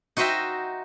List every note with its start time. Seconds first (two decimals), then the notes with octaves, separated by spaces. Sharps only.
0.17 D#4 F#4 C5 D#5 E5 G5